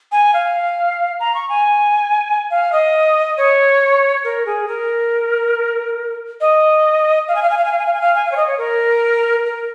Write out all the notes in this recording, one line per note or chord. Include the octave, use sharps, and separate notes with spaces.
G#5
F5
A#5
C#6
G#5
F5
D#5
C#5
A#4
G#4
A#4
D#5
F5
G#5
F5
G#5
F5
G#5
F5
G#5
F5
G#5
F5
G#5
F5
C#5
D#5
C#5
A#4
A#4